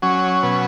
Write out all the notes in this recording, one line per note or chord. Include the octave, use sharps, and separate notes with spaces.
F#3 C#4
B2